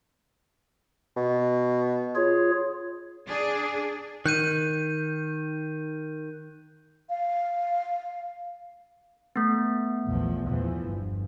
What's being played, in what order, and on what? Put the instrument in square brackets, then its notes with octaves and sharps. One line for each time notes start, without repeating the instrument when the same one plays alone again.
[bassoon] B2
[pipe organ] F4 G#4 C#5
[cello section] D4 G#4
[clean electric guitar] D#3 [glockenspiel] F#6 G6 D#7
[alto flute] F5
[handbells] A3 B3
[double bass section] A#1 E2 F3
E2 E3 F3
G1